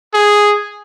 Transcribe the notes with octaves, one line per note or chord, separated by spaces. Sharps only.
G#4